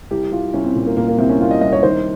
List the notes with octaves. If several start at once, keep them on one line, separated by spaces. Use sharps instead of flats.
C2 G4
C2 F4
C2 C#4
C4
A#2
A#3
A#2 A#3
A#3
C2 C4
C#4
C2 F4
D#5
C2 D#5
C#5
D#3 C5